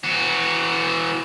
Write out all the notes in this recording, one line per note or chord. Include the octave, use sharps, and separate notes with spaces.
E3 F#4